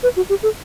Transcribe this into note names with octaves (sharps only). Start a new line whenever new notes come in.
B4
F#4
G4
A4